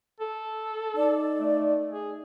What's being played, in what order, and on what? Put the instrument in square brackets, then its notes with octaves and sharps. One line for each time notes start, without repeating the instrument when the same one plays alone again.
[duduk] A4
[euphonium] D#4 [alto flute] D5
[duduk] A3
G#4